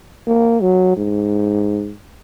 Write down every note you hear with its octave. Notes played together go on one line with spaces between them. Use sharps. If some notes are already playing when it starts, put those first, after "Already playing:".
A#3
F#3
G#2